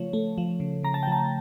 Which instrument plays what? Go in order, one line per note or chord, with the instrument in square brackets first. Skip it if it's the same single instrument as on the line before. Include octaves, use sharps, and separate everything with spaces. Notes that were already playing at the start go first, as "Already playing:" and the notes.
Already playing: [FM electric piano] C#3 F3 A3 C#5
A3
F3
C#3
C#3 A#5
A5
G5
F3 A5